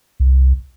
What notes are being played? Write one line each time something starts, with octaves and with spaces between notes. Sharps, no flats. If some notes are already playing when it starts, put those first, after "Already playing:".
C2